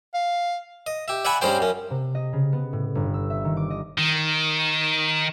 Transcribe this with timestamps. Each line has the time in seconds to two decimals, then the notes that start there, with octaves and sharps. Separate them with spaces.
0.14 F5
0.87 D#5
1.08 G4 E5
1.25 D5 E5 F#5 G#5 B5
1.41 G2 G3 C#4 G#4 C5 G5
1.60 F#2 C#4
1.90 C3
2.15 D#5
2.33 C#3
2.53 B3
2.73 A2
2.95 G1
3.14 E6
3.30 E5
3.45 D#3
3.57 D6
3.70 D#5
3.98 D#3